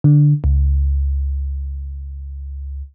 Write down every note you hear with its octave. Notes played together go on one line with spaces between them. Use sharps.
D3
C#2